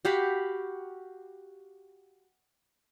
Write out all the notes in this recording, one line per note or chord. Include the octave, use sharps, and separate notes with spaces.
F#4 G4 F5 B5